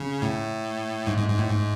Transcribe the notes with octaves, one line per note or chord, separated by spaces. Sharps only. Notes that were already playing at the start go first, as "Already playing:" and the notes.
Already playing: C#3
A2
G#2
G#2
G#2
A2
G#2